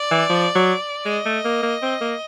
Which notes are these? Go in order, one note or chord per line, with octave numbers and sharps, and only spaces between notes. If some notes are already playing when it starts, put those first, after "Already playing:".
Already playing: D5
E3
F3
F#3
G#3 D#5
A3
A#3
A#3
C4
A#3